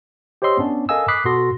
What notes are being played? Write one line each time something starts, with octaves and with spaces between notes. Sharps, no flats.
G4 C5 C#5 D#5 C6 E6
B3 C#4 D4
A4 A#4 D#5 F5 G#5 E6
B5 D6 D#6 F#6 B6 C7
B2 F#4 A4 C6 A#6